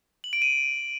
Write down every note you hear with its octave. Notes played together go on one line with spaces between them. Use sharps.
F#7
D7
D#7